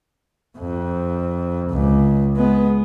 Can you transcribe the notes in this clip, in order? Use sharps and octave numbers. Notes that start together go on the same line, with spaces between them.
F2
C#2
G#3 B3